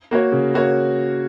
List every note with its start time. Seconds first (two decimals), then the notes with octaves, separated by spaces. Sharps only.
0.11 A#3 F#4 C#5
0.32 C#3
0.54 A#3 F#4 C#5